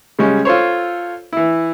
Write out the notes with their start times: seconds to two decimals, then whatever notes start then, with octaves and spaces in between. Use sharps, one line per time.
0.19 C#3 G3 G#3 C#4
0.45 F4 A4 C5 C#5
1.33 E3 E4